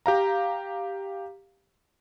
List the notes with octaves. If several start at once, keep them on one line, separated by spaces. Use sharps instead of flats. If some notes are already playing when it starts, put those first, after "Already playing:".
G4 F5 A#5